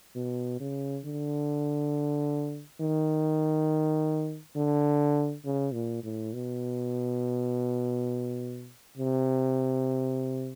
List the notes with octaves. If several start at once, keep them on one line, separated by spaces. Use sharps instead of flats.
B2
C#3
D3
D#3
D3
C#3
A#2
A2
B2
C3